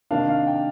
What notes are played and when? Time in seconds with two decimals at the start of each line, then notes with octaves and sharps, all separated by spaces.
0.11 C3 D#3 A#3 D4 F5
0.29 F5
0.47 G5